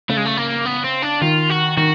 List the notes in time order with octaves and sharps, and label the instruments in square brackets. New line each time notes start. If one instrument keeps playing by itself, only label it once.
[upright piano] C#3 [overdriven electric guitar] A3
[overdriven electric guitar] G#3
A3
A#3
B3
C4
D4
[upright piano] D#3 [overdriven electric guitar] F4
[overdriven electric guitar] F#4
[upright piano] D#3 [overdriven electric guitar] F#4